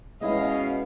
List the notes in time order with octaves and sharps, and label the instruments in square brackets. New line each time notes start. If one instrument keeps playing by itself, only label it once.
[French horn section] B2 C#4 [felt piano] G#3 E4 [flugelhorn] D#5 [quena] F5